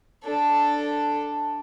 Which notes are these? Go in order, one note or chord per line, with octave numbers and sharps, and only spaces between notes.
D4 A4